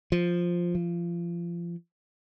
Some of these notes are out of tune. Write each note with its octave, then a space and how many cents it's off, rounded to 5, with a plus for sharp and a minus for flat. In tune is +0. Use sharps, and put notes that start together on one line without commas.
F3 +0
F3 -25